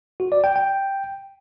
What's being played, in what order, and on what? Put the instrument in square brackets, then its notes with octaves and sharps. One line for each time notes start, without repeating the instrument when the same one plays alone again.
[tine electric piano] F#4
D5
G5
G5